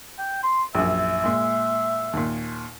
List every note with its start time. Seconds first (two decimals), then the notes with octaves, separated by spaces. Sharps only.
0.18 G5
0.43 C6
0.75 A#1 F#2 E5
1.24 A#2 G#3
2.13 D#2 A#2